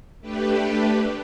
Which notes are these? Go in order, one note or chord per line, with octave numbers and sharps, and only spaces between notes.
A3 D4 G4 B4